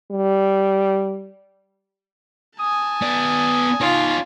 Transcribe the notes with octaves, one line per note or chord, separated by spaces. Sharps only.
G3
G#5 A5 D#6
B3 D5
D#4 F4 C#5